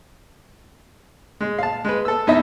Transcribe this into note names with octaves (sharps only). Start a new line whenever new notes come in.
G#3
F5 A5
G#3 B4
A4 E6
E2 D#4 D#5 E5